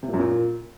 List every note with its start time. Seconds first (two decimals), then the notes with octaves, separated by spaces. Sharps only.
0.03 C3
0.08 A#2
0.14 F#2
0.19 A#2